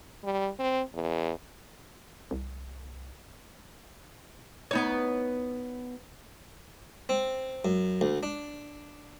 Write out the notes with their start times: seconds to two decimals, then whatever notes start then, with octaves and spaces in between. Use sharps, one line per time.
0.24 G3
0.59 C4
0.94 E2
2.31 C2
4.71 B3 D#4 C#5
7.09 C4
7.65 F#2
8.01 D2
8.23 D4